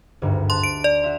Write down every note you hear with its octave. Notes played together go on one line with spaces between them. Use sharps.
G#1 D2 G2
A5 C6 F#6
D7
D5
F#4 E5 C6